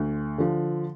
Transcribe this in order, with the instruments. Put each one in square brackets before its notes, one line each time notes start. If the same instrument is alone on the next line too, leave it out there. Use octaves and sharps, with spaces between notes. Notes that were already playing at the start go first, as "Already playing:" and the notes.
Already playing: [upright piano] D2
D3 F3